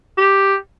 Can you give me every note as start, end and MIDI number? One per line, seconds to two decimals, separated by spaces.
0.17 0.56 67